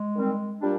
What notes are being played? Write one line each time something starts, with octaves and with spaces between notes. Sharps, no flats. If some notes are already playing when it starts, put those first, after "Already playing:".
Already playing: G#3
D#3 G3 C4
A#2 G3 D4